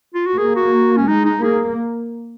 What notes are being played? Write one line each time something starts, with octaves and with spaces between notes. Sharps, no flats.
F4
F#4
A#3 G#4
F#4
C#4
G#3 D#4
D#4
A#3 G#4